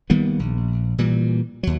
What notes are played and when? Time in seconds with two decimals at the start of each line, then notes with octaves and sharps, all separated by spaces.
0.10 D#3 G3 A#3 B3
0.39 A#1
0.98 A#2 E3 G3
1.63 D#2 F#3